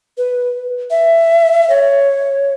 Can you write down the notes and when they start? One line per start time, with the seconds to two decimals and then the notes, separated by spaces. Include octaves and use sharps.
0.18 B4
0.91 E5
1.70 C#5